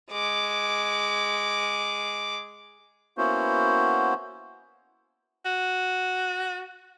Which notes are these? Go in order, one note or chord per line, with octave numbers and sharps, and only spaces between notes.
G#3 D6
A#3 B3 C#4 E4 F#4 C5
F#4